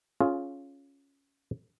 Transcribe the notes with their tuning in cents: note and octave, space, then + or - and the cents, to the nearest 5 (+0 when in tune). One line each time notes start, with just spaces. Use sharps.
C#4 +0 F4 +0 G#4 +30